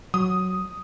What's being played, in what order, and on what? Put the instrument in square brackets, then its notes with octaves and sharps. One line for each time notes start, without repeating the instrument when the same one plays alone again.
[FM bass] F#3 [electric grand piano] D#6